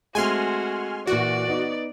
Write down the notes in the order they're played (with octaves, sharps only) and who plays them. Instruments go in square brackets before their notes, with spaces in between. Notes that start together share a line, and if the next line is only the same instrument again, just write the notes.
[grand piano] G#3 A3 C4 [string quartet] F#4 [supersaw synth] G#5 C6 F6
[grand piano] A#2 E3 [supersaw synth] F#4 [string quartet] D5
[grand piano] B3 D#4